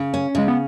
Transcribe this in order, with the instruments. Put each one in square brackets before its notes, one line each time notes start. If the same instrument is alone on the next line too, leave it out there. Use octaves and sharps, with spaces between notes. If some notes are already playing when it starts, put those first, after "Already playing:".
Already playing: [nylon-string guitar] C#3
C#4
[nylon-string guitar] C#3 [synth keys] G#3
[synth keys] B3